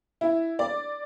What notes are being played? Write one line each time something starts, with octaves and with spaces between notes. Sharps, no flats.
E4
D5